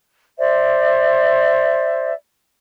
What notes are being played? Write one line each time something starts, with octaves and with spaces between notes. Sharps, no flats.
C5 D5 E5